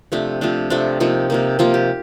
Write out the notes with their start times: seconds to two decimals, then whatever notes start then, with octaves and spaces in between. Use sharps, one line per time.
0.12 C3 F3 A3 D4
0.41 C3 F3 A3 D4
0.70 C3 F3 A3 D4
1.00 C3 F3 A#3 D#4
1.30 C3 F3 A#3
1.59 C3 F3 A#3 F4
1.74 G4